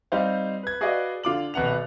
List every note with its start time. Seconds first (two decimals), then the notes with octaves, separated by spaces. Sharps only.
0.12 G3 C4 D#4 G4 C5 F5
0.63 B4 G#6
0.81 F#4 G#4 B4 D5 D#5 F5
1.23 D3 F4 D6 F#7
1.54 D#1 B2 B4 F#5 F7